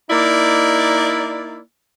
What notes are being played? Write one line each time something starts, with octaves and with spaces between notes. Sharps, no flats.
A#3 D#4 E4 D5